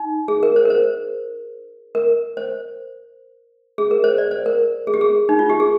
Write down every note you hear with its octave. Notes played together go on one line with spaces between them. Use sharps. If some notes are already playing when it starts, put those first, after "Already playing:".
Already playing: D#4
G#4
A#4
C5
A#4
C5
A#4
C5
G#4
A#4
C5
D5
C5
A#4
G#4
G4
G#4
D#4
F4
G4
G#4